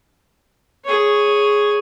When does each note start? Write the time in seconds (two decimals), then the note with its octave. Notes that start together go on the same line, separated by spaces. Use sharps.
0.85 G#4 C#5